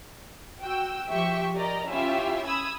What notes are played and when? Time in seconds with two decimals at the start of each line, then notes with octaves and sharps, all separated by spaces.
0.61 F#4 G5 E6
1.08 F3 G4 E5 G5 C#6
1.55 G4 A#4 D5 D#5 A#5
1.88 C#4 E4 F4 G4 E5
2.46 B5 D#6 E6 G#6